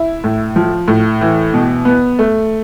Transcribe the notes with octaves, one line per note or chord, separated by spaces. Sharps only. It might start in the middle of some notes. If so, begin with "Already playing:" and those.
Already playing: E4
A2
F3
A2
E3
B2
B3
A3